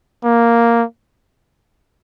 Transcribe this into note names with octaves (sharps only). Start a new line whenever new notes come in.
A#3